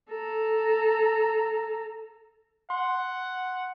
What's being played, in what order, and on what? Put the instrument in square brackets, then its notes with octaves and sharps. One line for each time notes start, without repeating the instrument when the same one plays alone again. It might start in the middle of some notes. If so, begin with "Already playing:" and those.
[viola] A4 A#5
[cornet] F#5 [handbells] C6